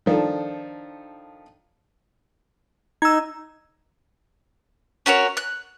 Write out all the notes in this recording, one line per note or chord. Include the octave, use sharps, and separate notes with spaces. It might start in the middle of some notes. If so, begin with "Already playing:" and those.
D#3 F3 D4 A4
D#4 E6 G#6
C#4 F#4 A#4 C#5
F#6